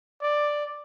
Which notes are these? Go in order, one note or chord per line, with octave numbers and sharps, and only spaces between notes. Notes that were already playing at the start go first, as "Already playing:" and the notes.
D5